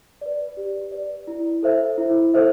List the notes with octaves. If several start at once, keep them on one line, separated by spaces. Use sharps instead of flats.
B4 D5
G4
B4 D5
E4
A4 C5 E5
E4
A4 C5 E5